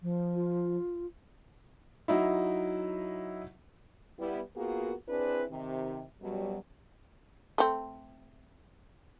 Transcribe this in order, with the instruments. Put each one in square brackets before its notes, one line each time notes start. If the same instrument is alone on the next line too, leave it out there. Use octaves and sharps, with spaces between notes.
[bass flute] F3
[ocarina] F4
[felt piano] F#3 D#4 E4
[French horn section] G3 B3 E4
A#3 B3 F4 F#4 G#4 A#4
C4 D4 E4 G#4 B4
C3 D#3
F#2 B2 F#3 G3
[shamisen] A3 C4